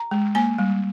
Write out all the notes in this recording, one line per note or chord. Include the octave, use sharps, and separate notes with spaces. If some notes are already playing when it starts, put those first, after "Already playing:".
Already playing: A#5
G#3
A#3 G#5
G3